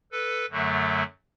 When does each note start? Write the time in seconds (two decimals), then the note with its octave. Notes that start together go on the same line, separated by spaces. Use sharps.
0.12 A4 B4
0.50 F#2 D3 F#3 A3